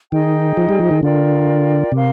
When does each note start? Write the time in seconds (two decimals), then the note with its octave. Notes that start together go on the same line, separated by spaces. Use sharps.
0.12 D#3 D#4 G#4 D#5 G5
0.57 F3
0.69 G3
0.80 F3
0.91 D#3
1.02 D3 F4 A#4 D5 G5
1.92 C3 G4 A#4 F5 C6